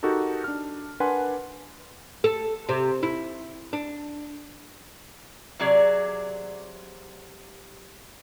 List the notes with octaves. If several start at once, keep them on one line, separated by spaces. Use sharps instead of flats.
D#4 F#4 G4 A4 A#4
D4 F6
D4 A#4 B4 F#5 G#5 C6
A4
C3
E4
D4
C3 F#3 G#4 D5